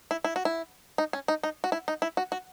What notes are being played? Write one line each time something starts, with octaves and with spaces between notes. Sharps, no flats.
E4
E4
F#4
E4
D#4
C#4
D#4
D#4
F#4
E4
D#4
E4
F#4
F#4